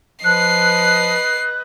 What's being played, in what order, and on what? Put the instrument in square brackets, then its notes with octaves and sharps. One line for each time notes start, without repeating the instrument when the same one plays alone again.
[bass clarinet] F3 [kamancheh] B4 D#5 [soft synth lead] F#6 [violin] C7